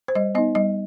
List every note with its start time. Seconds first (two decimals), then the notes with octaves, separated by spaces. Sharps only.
0.08 C5
0.15 G3 D#5
0.35 B3 D#4 D#5
0.55 G3 D#5